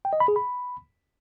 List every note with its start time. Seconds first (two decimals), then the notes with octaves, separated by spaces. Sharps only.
0.05 G5
0.13 D#5
0.20 B5
0.28 G#4
0.36 B5